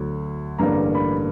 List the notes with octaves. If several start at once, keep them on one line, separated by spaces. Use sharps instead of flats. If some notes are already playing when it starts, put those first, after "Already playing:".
Already playing: D2 D3 F#3
A1 G2 D3 G3 A#3 A#5
B5